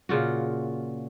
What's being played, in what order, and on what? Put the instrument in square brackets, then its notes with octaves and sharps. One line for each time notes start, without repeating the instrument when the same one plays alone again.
[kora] A#2 C#3 F4 F#4